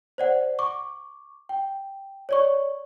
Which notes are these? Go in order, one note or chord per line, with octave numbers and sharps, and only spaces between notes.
C5 D5 F#5
C#6 D6
G5
C#5 D5 C#6